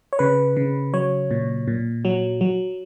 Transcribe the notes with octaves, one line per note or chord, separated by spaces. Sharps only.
C#5
C#3 B4
C#3
F#3 C#5
A#2
A#2
F#3
F#3